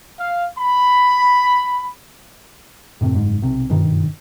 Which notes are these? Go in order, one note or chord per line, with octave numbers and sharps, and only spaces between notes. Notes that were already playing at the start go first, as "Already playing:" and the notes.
F5
B5
F#2 A2 C3
F#1 G#2
B1 C3
F#1 G2 B2 D#3